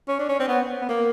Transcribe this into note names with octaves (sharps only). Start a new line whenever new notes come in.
C#4
D4
C#4
C4
B3
B3
A#3